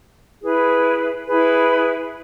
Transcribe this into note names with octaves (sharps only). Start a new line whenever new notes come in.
E4 G#4 B4
E4 G#4 B4